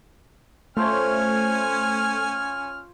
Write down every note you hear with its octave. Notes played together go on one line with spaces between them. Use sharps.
A3 C#4 F4 C5 C#5 G#5 F6